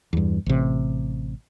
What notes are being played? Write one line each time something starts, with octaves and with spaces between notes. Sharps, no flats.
E2 G2
A1 C3